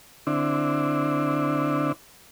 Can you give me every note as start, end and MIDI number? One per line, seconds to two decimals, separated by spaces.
0.27 1.92 50
0.27 1.92 60
0.27 1.92 62
0.27 1.92 64